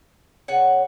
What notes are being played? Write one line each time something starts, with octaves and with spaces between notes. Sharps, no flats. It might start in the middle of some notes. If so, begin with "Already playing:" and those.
C#3 B3 C#5 F#5